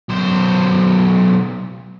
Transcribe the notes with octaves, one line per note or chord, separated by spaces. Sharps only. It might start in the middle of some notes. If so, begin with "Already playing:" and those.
B1 C5